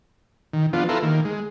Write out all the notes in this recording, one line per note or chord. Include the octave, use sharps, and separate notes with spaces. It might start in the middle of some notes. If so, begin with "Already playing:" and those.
D#3
F3 B3 D4 F4
E4 F4 A4 B4 A#5 C6
D#3 A#3
G#3